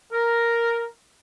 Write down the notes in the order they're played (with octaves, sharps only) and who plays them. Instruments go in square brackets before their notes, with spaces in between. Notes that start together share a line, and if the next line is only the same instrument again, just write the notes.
[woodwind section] A#4